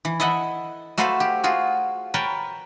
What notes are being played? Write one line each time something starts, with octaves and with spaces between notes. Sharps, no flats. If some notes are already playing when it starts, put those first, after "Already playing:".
E3
E4 A4 D#5 E5 F#5
A3 F#4 A4 B4 C5 F5
G4
F4 F#4 G#4
A#4 B4 C#5 G5 A5